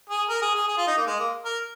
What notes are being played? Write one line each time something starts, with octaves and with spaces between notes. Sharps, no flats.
G#4
A#4
G#4
G#4
G#4
F4
D#4
A#3
G#3
A#3
A#4